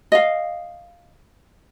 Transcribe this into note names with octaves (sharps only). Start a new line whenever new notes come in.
D#5 F5